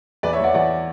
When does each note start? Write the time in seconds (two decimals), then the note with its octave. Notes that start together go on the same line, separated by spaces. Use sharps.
0.23 E2 B4 D5
0.33 C#5 E5
0.39 E2 D5 F#5
0.54 E2 D5 F#5